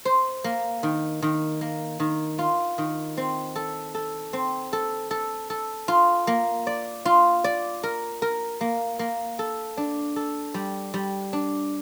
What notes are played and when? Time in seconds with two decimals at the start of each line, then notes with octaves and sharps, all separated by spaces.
0.05 C5
0.44 A#3
0.83 D#3
1.22 D#3
1.61 A#3
2.00 D#3
2.39 F4
2.78 D#3
3.17 C4
3.56 A4
3.95 A4
4.33 C4
4.73 A4
5.11 A4
5.50 A4
5.88 F4
6.27 A#3
6.67 D5
7.05 F4
7.44 D5
7.83 A#4
8.22 A#4
8.61 A#3
8.99 A#3
9.39 A4
9.77 D4
10.16 A4
10.54 G3
10.94 G3
11.33 D4